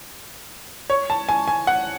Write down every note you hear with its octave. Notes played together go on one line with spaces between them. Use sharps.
C#5
A5
G#5
G#5
F#5